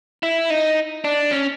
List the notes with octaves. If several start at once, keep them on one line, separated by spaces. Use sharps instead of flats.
E4
D#4
D4
C#4